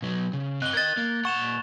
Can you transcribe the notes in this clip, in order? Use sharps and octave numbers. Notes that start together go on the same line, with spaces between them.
B2 F#3
C#3
C4 D#5 F#6 G7
A#4 D#5 G#6 A6
A#3
A#2 F#5 C#6 E7 F7